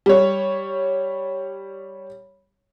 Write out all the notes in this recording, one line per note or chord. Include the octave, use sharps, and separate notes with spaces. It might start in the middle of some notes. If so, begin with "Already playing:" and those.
G3 C#5